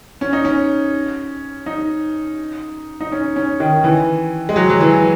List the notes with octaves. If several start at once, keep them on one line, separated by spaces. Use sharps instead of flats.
C#4
D#4
C#4
D#4
D#4
C#4
C#4
D#3
E3
G#3
F#3
F#3
E3